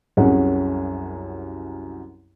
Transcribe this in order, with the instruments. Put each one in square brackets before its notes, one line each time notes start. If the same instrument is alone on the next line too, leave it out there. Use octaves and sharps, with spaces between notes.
[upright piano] C2 F#2 C#4 G#4 F#5